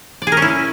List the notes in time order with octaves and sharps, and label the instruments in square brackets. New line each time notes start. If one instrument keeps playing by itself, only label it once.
[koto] D5
G#4
A#4
C#4
E4